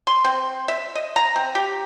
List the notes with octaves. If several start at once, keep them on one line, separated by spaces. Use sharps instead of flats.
C6
C4
E5
D#5
A#5
C4
G4